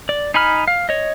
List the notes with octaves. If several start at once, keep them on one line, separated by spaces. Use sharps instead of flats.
D5
D#4 G#5 B5 F6
F5
C#5 D#5